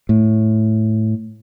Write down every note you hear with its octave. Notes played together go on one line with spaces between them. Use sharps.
A2